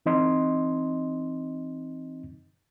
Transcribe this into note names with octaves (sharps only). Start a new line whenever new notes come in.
E3 C4 D#4 D#5 C6